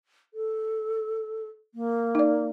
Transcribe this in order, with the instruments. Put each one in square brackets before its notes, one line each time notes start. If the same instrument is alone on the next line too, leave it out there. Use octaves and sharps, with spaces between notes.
[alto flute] A4
A#3
[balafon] D#4 D5